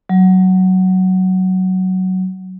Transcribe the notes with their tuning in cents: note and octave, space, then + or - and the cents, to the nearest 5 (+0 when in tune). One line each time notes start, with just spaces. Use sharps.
F#3 +10